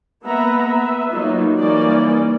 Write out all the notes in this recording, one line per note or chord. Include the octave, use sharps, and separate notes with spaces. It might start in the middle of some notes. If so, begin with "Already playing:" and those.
A#3 B3 B4 E5 F#5 A#5
B4 E5
F#3 A#3 D#4 F4
E3 G3 A#3 C#4 D#4 D5